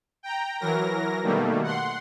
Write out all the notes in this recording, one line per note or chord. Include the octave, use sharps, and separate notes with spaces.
G5 A#5
E3 F#3 A#4 A#6
B2 D#3 G3 A3 A#3
F#5 C6